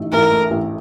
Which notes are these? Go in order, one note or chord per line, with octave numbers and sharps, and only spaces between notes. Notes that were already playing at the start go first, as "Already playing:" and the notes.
Already playing: A1 A3 D#4
A1 A#4
A3
A1